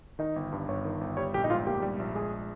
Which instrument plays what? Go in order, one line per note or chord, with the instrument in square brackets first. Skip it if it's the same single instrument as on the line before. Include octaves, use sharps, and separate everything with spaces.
[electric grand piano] D#3 [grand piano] D#4
[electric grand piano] G1
G2
[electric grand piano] G1 [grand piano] C#5
[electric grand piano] D#3
G1
[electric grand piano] G3 [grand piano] C#5
[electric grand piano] A#1 [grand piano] G4
[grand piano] D#4
[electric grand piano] G#2 [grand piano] F4
[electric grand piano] A#3 [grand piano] G4
[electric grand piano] G3
A#1
[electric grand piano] G#3 [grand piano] G#4